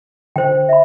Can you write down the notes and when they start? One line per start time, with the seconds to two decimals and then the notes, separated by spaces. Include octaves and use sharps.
0.36 D3 C5 G5
0.69 E5 B5